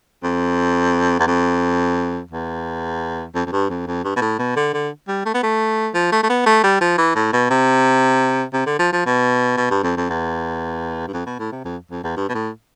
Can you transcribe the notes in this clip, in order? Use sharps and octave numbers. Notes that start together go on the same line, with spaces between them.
F2
E2
F2
E2
F2
F2
G2
F2
F2
G2
B2
A2
B2
D3
D3
G3
A3
B3
A3
F3
A3
A3
B3
A3
G3
F3
E3
A2
B2
C3
C3
D3
F3
F3
B2
B2
G2
F2
F2
E2
G2
F2
B2
A2
C3
F2
F2
E2
G2
B2
A2